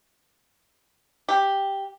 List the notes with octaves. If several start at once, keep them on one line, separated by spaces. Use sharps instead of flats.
G4